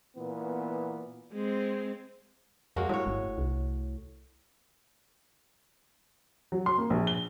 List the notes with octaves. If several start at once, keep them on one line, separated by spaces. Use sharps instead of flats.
A#2 E3 B3
G#3 C4
F2 G#3 A#3 F#4
A2 G3 C#5
G1
C2
F#3
C6
A#3
A#1
G7